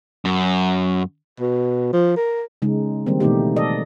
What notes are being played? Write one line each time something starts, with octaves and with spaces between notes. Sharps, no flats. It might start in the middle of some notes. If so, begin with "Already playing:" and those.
F#2
B2
F3
A#4
C#3 G#3 D#4
D#3 G3 A#3 C4
B2 E3 A3 D#4 G4
A4 D5 D#5